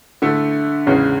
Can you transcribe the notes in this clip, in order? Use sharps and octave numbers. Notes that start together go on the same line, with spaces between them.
D3 A3 E4
E2 C#3 G#3 C#4